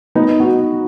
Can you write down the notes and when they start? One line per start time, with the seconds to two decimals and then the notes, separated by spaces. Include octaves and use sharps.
0.15 B3 D#4
0.40 D#4 F#4